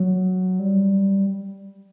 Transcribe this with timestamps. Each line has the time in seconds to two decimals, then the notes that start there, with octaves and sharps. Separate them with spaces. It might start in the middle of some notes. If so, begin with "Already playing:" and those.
Already playing: F#3
0.59 G3